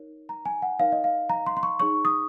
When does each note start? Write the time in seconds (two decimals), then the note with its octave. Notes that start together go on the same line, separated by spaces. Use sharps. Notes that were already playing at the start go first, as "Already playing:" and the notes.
Already playing: D#4 A#4 C#5
0.29 A#5
0.46 G#5
0.62 F#5
0.80 D#4 A#4 C#5 F5
0.92 D#5
1.04 F5
1.30 A#5
1.46 C6
1.57 C6
1.63 C#6
1.80 D#4 G#4 C#5 C#6
2.05 D#6